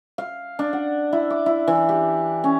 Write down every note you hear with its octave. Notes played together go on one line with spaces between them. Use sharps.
F5
D4
F#5
E4
D6
E4
E3
G4
C#4